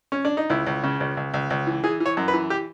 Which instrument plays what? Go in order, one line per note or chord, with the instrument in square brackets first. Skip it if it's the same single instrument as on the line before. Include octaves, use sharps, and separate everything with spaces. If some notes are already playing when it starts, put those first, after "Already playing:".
[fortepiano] C#4
D4
D#4
C#2 E4
C#2
C#3
C#2
C#2
C#2
C#2
E3
E3 G#4
E3
C#5
F#2
B4
E3
G4